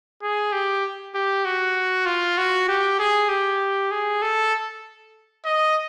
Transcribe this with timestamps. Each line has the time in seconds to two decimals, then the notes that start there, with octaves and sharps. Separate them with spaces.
0.22 G#4
0.52 G4
1.14 G4
1.45 F#4
2.06 F4
2.38 F#4
2.68 G4
2.99 G#4
3.29 G4
3.91 G#4
4.22 A4
5.45 D#5